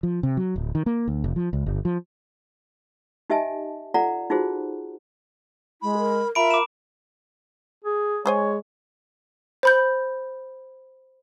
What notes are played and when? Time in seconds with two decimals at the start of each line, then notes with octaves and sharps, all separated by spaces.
0.03 F3
0.23 C3
0.37 F#3
0.56 D1
0.75 D#3
0.86 A#3
1.08 D2
1.24 F1
1.36 F3
1.53 C#2
1.66 G1
1.85 F3
3.30 D#4 G4 D#5 E5 G#5 A5
3.94 F4 A4 D5 F#5 A#5
4.30 D#4 F4 F#4 G#4 C5
5.82 G#3 E4 B5
5.98 A#4
6.35 F4 A#4 E5 A#5 B5 D7
6.51 D6 E7
7.85 G#4
8.26 G#3 G#4 C5 C#5 G#5
9.63 C5 B5 G6